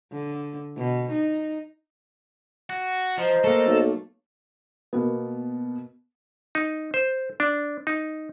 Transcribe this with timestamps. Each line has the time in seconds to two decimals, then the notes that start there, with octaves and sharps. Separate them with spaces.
0.13 D3
0.77 B2
1.11 D#4
2.70 F#4
3.18 F3 C5 D#5 A#5
3.44 A3 A#3 A4
3.67 B1
4.93 B2 A#3 B3
6.55 D#4
6.94 C5
7.40 D4
7.87 D#4